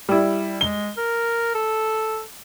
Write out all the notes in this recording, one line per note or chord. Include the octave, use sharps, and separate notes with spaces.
G3 E4
G#3 G7
A#4
A4